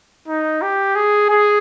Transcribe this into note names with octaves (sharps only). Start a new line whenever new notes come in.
D#4
G4
G#4
G#4